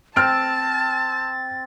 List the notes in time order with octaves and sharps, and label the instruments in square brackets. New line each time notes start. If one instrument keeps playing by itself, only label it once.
[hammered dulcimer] C4 [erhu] A5 [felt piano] F6 D7 [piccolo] A6